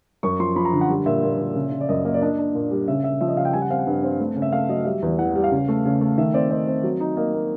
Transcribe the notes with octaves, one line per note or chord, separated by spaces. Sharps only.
F#2 C#6
F3 C6
F3 B5
A#5
D3
F#5
G3
A#2 E5
A#2
A#2
C#3
C#3
D5
F#2 D#5
A#3 D#5
D5
D4 D#5
D4
A#2
G3
C#3 E5
C#3 E5
F3 E5
D#5
C#3 F5
G5
G3 G#5
F#5
C4 F5
F#5
G2
C4
A3
C#3
E5
A3 F5
F#3 D#5
G3 E5
E2
E3 F#5
G3
F5
C#3
A3
C#3
A3
D#3 E5
C4 D5
C4 D#5
C4
F#3
D#4
A#3 D#5
A#3